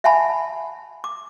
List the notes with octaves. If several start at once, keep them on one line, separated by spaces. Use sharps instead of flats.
E5 F#5 G#5 A5 B5
D6